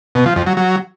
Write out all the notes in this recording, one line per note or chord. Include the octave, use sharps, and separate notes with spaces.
B2
F3
F2
F#3
F#3